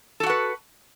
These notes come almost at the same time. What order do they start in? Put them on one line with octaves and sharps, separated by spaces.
A4 F#4 F#5 B4